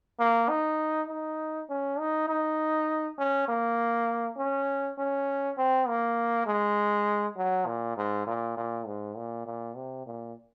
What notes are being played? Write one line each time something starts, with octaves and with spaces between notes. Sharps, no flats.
A#3
D#4
D#4
C#4
D#4
D#4
C#4
A#3
C#4
C#4
C4
A#3
G#3
F#3
A#2
G#2
A#2
A#2
G#2
A#2
A#2
C3
A#2